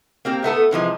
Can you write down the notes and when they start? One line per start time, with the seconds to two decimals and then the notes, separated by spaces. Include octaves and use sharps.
0.25 A#3 C4 G4
0.43 A2 A3 B3 A4
0.71 C3 E3 F3 G#3